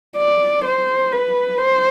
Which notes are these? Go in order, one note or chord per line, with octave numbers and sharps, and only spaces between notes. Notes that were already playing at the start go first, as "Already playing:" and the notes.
D5
C5
B4
C5